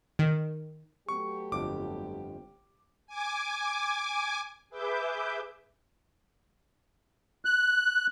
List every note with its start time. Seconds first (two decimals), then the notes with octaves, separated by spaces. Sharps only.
0.19 D#3
1.09 F#3 A3 B3 G4 C#6
1.52 G1 F2 D6
3.07 G#5 D6
4.70 G#4 B4 E5 D6 G6
7.45 F#6